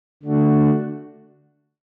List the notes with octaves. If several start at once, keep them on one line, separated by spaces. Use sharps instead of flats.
D3 A3 D4 F#4